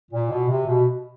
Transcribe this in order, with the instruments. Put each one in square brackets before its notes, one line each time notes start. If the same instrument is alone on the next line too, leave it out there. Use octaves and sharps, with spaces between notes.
[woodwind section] A#2
B2
C3
B2